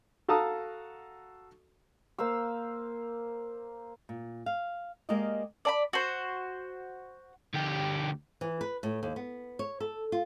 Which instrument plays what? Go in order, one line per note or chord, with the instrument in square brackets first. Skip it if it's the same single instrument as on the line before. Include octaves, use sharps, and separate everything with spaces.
[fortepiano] F#4 A4 F5 A5 A#5 D#6
[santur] A#3 C5 F5 E6
[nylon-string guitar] A#2
F5
G#3 A#3 G4 A#4 D5 D#5
[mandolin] D5 A#5 B5
F#4 C5
[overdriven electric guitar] D2 G4
[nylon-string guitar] E3
B4
A2
D#2
B3
C#5
A4
F4